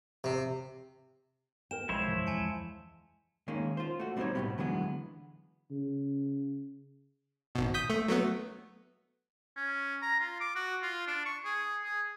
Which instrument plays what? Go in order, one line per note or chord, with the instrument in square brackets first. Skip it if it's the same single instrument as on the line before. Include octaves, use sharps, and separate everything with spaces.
[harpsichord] C3
[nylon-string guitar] A#4 G5 [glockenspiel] E7
[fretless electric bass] B1 [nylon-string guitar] F3 G#3 [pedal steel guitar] E4 C5 C#5
[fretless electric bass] G2 C3 E3
[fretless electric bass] D1 F2 E3 [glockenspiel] G#5 A5 C#7
[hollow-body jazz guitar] D#3 G#3 A#3 C#4
F4 C5
A3 F#4
G3 C4 D#4 A4 C5 C#5
A2 C3 D#3 E3 G3 B3
D3 E3 F#3 G#3 B3 D4
[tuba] C#3
[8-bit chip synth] G#1 B2
D#6 G6 B6
A3
F#3 A3 B3
[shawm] C#4
A#5
F4
D6
F#4
F4
D4
C#6
G#4
G#4